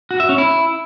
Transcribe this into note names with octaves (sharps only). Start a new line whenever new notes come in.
F#4
E5
C#4
E4